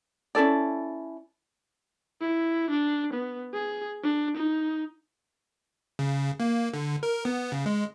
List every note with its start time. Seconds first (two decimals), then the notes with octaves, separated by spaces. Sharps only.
0.35 C#4 E4 A4 D5
2.21 E4
2.70 D4
3.13 B3
3.54 G#4
4.03 D4
4.37 D#4
5.99 C#3
6.40 A#3
6.73 D3
7.03 A#4
7.25 B3
7.52 C#3
7.66 G#3